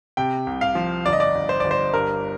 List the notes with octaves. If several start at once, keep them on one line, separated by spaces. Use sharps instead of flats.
C3 G5
C2
F5
F3
G1 D5
D#5
D5
G1
C5
G1 D5
C5
G2 A#4